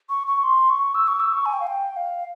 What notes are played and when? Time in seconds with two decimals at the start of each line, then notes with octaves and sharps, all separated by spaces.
0.09 C#6
0.27 C#6
0.43 C6
0.70 C#6
0.95 E6
1.08 C#6
1.20 E6
1.33 C#6
1.46 G#5
1.53 G5
1.60 F5
1.67 G5
1.96 F5